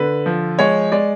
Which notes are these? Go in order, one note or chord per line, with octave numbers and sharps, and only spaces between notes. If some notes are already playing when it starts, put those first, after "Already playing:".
Already playing: D3 B4
F3
G#3 C#5
G#3 D5